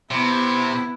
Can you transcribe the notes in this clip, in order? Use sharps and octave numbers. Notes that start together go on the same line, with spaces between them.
C3 B3 E4